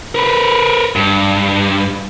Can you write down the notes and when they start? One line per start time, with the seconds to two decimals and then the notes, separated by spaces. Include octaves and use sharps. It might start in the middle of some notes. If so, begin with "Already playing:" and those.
0.15 A#4 B4
0.96 G2